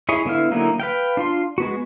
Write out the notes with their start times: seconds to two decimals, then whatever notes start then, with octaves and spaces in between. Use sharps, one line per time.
0.09 E4 G#4 C#5 D#5
0.25 D3 B3 E4 F5 F6
0.51 D3 F#3 A#3 D#4 E4
0.80 B4 F5 G5
1.17 D4 F4 C6
1.58 G#3 B3 F#4